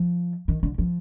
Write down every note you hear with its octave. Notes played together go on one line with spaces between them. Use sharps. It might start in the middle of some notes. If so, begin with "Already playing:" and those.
Already playing: F3
D#3
D3
F3